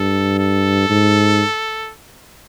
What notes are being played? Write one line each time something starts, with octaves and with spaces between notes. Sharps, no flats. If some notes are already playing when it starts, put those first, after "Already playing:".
Already playing: G2 A4
A4
G#2